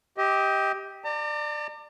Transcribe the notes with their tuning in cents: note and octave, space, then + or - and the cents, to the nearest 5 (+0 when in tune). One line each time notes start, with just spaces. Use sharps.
G4 +0 D#5 +30
D5 +20 A#5 -45